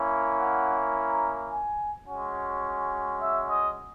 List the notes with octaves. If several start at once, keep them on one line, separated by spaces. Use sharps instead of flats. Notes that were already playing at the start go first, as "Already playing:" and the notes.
Already playing: A#3 C#4 E4
F#5
A#5
G#5
G#3 C#4 F#4 G#5
E5
D#5